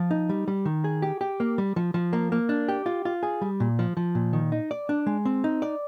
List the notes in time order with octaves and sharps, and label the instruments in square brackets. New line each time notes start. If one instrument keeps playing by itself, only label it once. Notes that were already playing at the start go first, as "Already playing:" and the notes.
Already playing: [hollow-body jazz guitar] F3
D#4
G3
G3
D#3
G#4
G4
G4
A#3
G3
F3
F3
A#3
A#3
D4
G4
F4
F4
G#4
G3
A#2
F3
F3
A#2
D#3
D#4
D5
D4
G#3
C4
D#4
D5